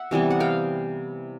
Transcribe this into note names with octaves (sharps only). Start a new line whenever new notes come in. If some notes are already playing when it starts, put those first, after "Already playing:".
Already playing: E5 F#5
C3 E3 G3 B3
F#5
F5 G5